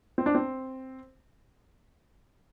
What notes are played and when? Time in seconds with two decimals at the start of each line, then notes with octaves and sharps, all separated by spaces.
0.18 C4
0.26 D4
0.35 C4